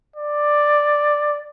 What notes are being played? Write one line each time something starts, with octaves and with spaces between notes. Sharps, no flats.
D5